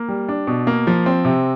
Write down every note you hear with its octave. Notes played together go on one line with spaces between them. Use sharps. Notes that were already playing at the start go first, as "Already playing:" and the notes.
Already playing: A#3
G3
D4
B2
A#3
F3
C4
C3